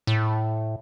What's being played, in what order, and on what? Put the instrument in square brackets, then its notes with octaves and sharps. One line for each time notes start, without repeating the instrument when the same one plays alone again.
[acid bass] A2